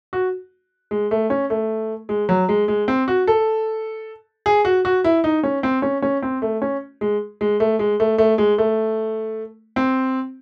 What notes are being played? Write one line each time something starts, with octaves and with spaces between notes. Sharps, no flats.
F#4
G#3
A3
C#4
A3
G#3
F#3
G#3
G#3
C4
F#4
A4
G#4
F#4
F#4
E4
D#4
C#4
C4
C#4
C#4
C4
A3
C#4
G#3
G#3
A3
G#3
A3
A3
G#3
A3
C4